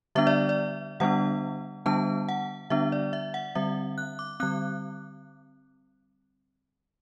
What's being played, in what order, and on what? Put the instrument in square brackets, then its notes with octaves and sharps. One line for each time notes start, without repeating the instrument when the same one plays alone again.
[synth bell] D3 G3 B3 D4 E5
D5
D5
D3 G3 B3 D4 F#5
D3 G3 B3 D4 A5
F#5
D3 G3 B3 D4 E5
D5
E5
F#5
D3 G3 C4 E5
F#6
D6
D3 G3 C4 F#6